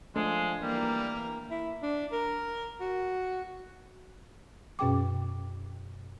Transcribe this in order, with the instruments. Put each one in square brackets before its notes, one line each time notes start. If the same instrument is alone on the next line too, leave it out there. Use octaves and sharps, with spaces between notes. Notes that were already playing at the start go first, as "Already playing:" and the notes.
[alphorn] F3 [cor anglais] G#3 [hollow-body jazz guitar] A3 D4
[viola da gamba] E3 A#3 [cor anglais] G3 [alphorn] A#4
[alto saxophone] E4
D4
A#4
F#4
[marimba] F#2 B2 C#4 G#4 G5 D6